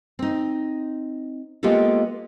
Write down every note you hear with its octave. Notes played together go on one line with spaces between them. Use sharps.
C4 D#4
G#3 A#3 B3 F4 G4 A4